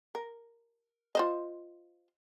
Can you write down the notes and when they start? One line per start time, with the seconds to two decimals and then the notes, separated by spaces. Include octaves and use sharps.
0.15 A#4
1.15 F4 C5 D#5